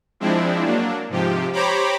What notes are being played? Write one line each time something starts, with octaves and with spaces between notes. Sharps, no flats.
F3 G#3 C4 D4 E4
F#3 A#3 D4
G#2 C3 F3 G4
G4 C5 C#5 A#5 B5 D6